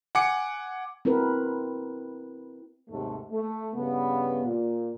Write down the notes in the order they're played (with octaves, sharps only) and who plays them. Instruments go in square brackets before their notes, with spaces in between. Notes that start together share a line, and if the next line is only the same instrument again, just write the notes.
[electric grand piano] F#5 G#5 D6 C#7
[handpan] C4 E4 F#4 A#4 B4
[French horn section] D#2 G#2 C3 A3 A4
A3
G2 C#3 B3
A#2